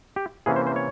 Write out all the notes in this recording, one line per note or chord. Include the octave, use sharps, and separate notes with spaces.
G4
C3 E3 A#3 C#4 G#4
C5
C5
C#5